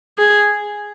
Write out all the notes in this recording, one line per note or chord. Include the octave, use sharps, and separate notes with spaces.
G#4